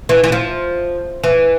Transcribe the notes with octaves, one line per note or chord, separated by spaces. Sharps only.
E3
E3
F3
E3